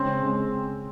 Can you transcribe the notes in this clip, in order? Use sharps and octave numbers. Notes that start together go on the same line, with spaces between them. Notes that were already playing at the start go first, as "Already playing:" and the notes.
Already playing: C#3 G#3 C4 C#4
C#3 G#3 C#4